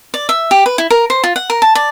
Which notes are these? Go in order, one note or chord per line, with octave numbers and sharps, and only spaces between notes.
D5
E5
G4
B4
E4
A#4
C5
F4
F#5
A#4
A5
D5